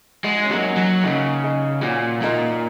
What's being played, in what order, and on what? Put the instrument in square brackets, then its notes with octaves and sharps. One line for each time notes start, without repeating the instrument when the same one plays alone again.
[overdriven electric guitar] G#3 [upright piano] F#4
[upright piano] D#4
C#4
[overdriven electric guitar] F#3 [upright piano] A#3 D#4
[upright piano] C#4 F#4
[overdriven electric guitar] F#3
[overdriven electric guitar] C#3 [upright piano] A#3 D#4
[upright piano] D#4 G#4
[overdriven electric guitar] A#2 [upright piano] C#4 F#4
[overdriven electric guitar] A#2 [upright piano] A#3 D#4